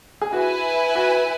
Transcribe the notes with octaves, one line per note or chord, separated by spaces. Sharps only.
G#4
E4 F#4 B4 G#5
F#4